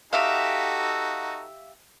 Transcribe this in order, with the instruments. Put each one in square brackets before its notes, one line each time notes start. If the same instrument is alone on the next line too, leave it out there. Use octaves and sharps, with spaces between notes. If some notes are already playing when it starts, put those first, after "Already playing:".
[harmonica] D#4 F#4 A4 [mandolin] G4 E5 F5